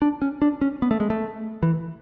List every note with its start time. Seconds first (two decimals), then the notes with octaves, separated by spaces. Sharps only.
0.02 D4
0.22 C#4
0.42 D4
0.61 C#4
0.82 B3
0.91 A3
1.00 G#3
1.10 A3
1.63 E3